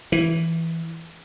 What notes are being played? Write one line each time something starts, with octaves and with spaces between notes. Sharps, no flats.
E3